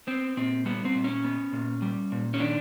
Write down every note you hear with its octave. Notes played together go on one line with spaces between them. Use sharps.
B3 C4
A#2 C4
G3 B3
C4
A#2
C#4
B3
A#2
G3
A#2
C#4
D#3 D4